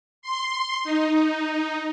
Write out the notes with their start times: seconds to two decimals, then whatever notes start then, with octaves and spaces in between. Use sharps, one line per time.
0.22 C6
0.84 D#4